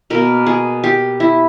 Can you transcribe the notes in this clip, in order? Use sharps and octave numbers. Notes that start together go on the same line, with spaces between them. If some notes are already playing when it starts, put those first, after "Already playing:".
B2 A#3 A#4
G#4
G4
E4